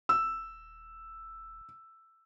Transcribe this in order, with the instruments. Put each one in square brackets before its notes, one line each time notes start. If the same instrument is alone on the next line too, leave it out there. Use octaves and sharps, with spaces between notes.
[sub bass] D#1 [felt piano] E6